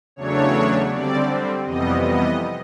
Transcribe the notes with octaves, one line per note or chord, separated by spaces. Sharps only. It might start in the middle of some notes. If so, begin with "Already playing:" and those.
E2 C#3 F#3 A3 D4 C#5
D3 G3 C4 D5
F2 C3 E3 G3 B3 D#5
D#5